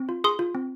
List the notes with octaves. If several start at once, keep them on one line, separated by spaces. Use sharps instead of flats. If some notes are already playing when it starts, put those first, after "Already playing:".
Already playing: C4
F4
G#4 C6 D#6
F4
C4